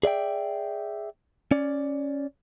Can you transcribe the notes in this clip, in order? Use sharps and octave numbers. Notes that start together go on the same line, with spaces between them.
G#4 D5 E5 G5
C#4 D5